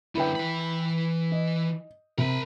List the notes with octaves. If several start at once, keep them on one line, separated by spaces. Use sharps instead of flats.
F#2 D3 E4 B4 G5
E3 B5
D#5
C3 A#4 B5